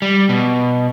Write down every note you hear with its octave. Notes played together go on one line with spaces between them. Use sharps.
G3
B2